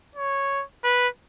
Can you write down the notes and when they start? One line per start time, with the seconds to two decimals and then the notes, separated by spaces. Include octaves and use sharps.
0.16 C#5
0.84 B4